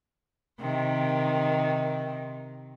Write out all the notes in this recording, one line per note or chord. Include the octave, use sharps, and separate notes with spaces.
C3 D#3